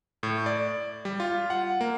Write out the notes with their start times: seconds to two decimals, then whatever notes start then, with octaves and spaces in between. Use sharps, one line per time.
0.23 A2
0.46 D5
1.05 G3
1.20 F4
1.50 F#5
1.81 A#3